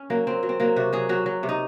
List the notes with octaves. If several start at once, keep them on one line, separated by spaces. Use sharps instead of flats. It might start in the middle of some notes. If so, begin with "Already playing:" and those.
Already playing: C#4
F#3 A#3
F#3 C4
F#3
C4
F#3 A#3
C3 F#4
F#3 G#4
F#3 F#4
F#3
C3
D#4